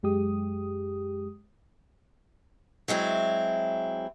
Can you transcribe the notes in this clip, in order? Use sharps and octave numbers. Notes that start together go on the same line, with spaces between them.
F#2 G#3 G4 D#6
F#3 G#3 C4 E4